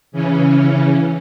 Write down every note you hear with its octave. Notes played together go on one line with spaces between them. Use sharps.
C#3 E3 C#4